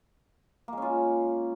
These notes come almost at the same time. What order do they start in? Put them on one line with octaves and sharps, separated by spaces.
A#3 G#3 C#4 F4